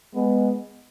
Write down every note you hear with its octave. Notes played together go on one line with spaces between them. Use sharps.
G#3 B3